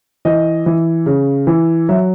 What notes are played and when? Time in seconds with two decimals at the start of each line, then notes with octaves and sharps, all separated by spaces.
0.25 E3 D#5
0.66 E3
1.06 C#3
1.47 E3
1.89 F#3 E5